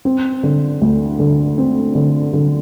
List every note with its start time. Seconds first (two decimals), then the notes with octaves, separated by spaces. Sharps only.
0.05 C4
0.43 D3
0.81 D2
1.19 D3
1.58 C4
1.95 D3
2.33 D3